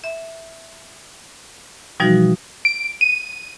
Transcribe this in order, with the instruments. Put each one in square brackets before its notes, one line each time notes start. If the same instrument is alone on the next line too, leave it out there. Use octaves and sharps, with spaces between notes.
[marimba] E5
B2 E3 F3 G3 D#4 F#4
[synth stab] D7
D#7